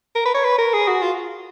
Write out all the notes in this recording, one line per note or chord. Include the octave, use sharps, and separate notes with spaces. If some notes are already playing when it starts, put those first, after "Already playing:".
A#4
B4
C#5
B4
A#4
G#4
F#4
F4